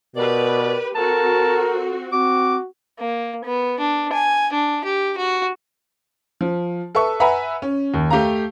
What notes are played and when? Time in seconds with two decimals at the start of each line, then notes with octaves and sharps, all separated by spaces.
0.16 B2 G4 A#4 B4 D5
0.95 C4 F#4 A4 A#4 A5
2.12 C4 F#4 D6
2.99 A#3
3.45 B3
3.80 D4
4.13 G#5
4.53 D4
4.85 G4
5.18 F#4
6.41 F3
6.95 A4 B4 E5 C#6
7.20 B4 E5 F#5 G#5 A#5 B5
7.62 C#4
7.94 D#2
8.10 A3 G4 F5 A#5